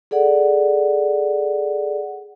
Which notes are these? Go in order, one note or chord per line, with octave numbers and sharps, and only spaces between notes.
G#4 A4 D5 F#5